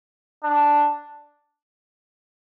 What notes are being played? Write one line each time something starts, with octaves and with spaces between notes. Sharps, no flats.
D4